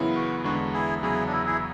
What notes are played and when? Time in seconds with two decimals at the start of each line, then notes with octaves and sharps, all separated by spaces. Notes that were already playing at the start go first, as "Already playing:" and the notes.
Already playing: F#2 C#3 E3 B3 E4
0.15 F#4
0.44 E2 D3 G#3 B3 D4 F#4
0.74 E4 G#4
1.03 E2 C#3 F#3 B3 E4 G#4
1.26 D4
1.32 E4
1.46 E4 G#4